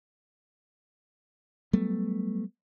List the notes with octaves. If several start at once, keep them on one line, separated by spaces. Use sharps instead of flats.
F#3 G3 A3 B3